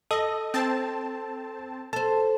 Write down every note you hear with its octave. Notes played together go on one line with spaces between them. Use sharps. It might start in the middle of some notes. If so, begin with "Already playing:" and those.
A4 D#5
C4 A5
A4 C5 A5